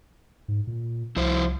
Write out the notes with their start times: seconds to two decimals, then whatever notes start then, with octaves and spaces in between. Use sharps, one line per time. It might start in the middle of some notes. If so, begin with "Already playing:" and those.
0.48 G#2
0.67 A#2
1.16 C2 F3 E4 C5